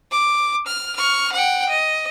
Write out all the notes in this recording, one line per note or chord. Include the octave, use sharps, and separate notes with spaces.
D6
F6
C#6 F6
F#5 G5
D#5